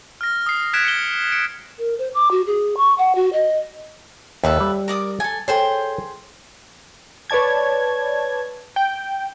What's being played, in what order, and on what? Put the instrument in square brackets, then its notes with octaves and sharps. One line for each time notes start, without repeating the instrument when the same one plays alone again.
[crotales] F6 A#6
D#6 C7
F#6 G#6 B6 D7 E7
C#7 G7
C#7 D7
[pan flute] A#4
C5
D6
F#4
G#4
C#6
F#5
F#4
D#5
[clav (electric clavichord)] D#2 [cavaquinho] A4 B4 E5
[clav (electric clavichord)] G3
[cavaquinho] A#4 D5 D#6
A4 G#5
[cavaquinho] G#4 C5 G5 [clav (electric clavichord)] A4 C#5
[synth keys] B4 C#5 D5 A5 G#6
G5